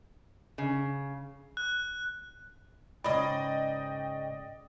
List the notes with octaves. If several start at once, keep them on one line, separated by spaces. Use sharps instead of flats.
C#3
F#6
G#2 C#3 D5 D#5 G5 B5 D#6